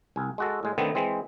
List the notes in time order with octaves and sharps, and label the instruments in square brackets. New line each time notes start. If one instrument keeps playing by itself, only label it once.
[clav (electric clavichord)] C2 G#5
G#3 F#4 A4
A2 G#3
D3 D#3 A3 B3 C4
E3 G#3 C4